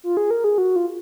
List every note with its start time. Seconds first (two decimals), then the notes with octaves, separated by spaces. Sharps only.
0.04 F4
0.17 G#4
0.31 A#4
0.44 G#4
0.58 F#4
0.76 F4